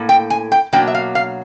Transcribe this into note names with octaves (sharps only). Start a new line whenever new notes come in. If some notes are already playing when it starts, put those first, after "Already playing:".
Already playing: A2 A#3
G5
G#5
G5
B2 F#3 A#3 D4 G5
E5
F5
F5